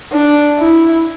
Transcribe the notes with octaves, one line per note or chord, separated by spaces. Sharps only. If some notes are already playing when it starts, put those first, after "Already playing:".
D4
E4